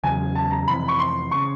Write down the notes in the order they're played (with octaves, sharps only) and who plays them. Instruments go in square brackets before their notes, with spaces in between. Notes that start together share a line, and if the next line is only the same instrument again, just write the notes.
[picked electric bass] E2 C#3 F#3 [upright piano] G#5
[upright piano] A5
A#5
[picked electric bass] F2 C3 E3 [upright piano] B5
[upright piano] C#6
C6
[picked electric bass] C#3 [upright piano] C#6